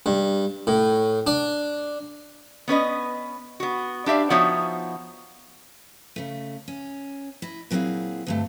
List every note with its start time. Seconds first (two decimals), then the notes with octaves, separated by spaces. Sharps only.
0.06 G2
0.67 A2
1.27 D4
2.68 B3 C#4 B4 D#5
3.60 B3 F#4
4.06 D4 G4 E5 F5
4.30 F3 B3 D#4 F#4 C#5 E5
6.16 C#3 A3
6.68 C#4
7.42 E4 D#5
7.71 A#2 F#3 C4 E4 G#4 F5
8.27 D2 G2 A3